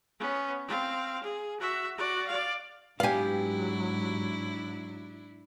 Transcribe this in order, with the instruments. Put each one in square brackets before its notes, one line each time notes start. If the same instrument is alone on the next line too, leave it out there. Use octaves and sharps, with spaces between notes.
[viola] B3 C#4
C4 F5
G#4
F#4 E5
F#4 D5
D5 F5
[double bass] G#2 F#3 [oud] B3 G4 [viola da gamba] D4 E4 [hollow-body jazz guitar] F5 G#5